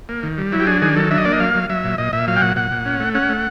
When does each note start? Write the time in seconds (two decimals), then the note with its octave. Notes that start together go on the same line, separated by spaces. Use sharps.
0.09 A#3
0.23 D#3
0.38 G3
0.52 F#3 E4
0.60 G4
0.67 D4 G#4
0.82 D#3 G#4
0.96 F#3 A4
1.11 D4 E5
1.18 D#5
1.25 A#3 D5
1.32 D#5
1.40 F#3 F5
1.55 F#3
1.69 F#3 E5
1.84 A#2
1.98 A#2 D#5
2.13 A#2 E5
2.27 F#3 F5
2.36 G5
2.41 A#2 F#5
2.56 A#2 F#5
2.71 A#2
2.85 C#4
3.00 A3
3.15 C#4 F#5
3.29 A3